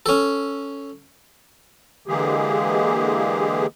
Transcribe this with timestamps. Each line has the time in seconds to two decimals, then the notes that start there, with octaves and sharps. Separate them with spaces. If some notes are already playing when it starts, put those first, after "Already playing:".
0.06 C#4 A4
2.08 D3 E3 G#3 A#3 G4 G#4